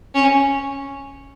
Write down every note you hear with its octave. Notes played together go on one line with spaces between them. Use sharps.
C#4